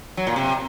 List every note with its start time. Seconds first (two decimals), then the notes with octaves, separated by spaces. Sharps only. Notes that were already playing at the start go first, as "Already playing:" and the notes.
0.17 F#3
0.27 A#2
0.36 C3